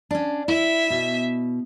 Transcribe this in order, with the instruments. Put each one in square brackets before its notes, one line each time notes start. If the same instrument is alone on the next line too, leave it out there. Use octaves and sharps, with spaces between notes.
[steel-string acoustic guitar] C#4 D4
[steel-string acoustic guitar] E4 [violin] E5
[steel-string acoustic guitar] B2